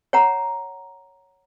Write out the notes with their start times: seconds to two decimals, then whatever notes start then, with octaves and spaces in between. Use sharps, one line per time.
0.13 C#5 F#5 A#5